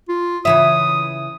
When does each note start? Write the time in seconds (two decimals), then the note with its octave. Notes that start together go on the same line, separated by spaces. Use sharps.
0.09 F4
0.45 C#3 E3 E5 D#6